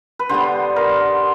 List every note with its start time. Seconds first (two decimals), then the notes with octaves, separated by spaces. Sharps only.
0.19 B4
0.29 D3 G3 B3 C5
0.76 A#4